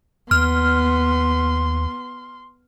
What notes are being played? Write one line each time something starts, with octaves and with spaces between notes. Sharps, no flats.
D#2 B3 C6 F6